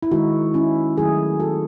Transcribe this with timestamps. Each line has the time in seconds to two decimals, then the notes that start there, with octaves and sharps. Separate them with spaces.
0.03 E4
0.11 D#3 G#3 D#4 F#4
0.54 C#4 E4
0.97 D#3 F#3 A3 E4 G#4
1.40 F#4 A4